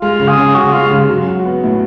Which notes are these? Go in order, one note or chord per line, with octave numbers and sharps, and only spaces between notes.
G#3 F4
C#3
G#4
C#4
C#3 F#4
G#3 F4
C#3
F#3
F#4
B3
A2